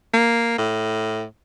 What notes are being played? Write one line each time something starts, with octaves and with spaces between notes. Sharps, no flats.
A#3
A2